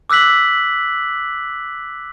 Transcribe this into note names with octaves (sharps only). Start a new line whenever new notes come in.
D6 E6 F#6 B6 F#7